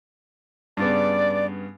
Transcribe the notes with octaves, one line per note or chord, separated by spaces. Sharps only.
G2 C#3 B3 D5